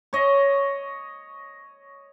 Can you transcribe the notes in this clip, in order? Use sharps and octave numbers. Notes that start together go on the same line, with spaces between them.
C#5 D#5